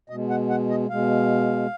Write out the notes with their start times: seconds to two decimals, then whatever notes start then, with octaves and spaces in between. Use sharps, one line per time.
0.10 B2 G#3 D#5
0.30 F#5
0.50 F#5
0.70 D#5
0.90 B2 G#3 F5